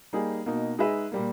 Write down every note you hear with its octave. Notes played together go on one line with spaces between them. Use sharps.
G3 A#3 D#4 G#4
B2 A#3 D#4
G#3 D#4 G#4 B4 E5
A#2 G3 A#3